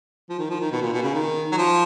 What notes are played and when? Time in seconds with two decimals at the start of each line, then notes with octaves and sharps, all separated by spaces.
0.29 F3
0.39 D#3
0.50 F3
0.61 D#3
0.72 B2
0.82 A#2
0.93 B2
1.03 C#3
1.14 D#3
1.52 F#3
1.57 F3